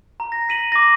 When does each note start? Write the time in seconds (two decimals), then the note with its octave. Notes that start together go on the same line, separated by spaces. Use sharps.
0.20 A#5
0.32 A#6
0.49 B6 D#7 F#7
0.72 D6 A#6